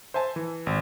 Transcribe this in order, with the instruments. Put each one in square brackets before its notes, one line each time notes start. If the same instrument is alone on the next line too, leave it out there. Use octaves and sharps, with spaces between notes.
[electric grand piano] C5 E5 G#5 A5
E3
G#1